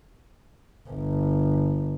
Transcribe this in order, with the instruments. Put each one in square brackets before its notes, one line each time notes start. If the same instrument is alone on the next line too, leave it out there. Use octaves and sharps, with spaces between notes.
[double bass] G1